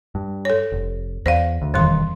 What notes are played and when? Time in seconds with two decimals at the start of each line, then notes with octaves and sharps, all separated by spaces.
0.15 G2
0.45 A4 C#5
0.72 F1
1.26 E2 C5 D5 F5
1.62 D2
1.74 E1 F2 D#3 E3 G3 C6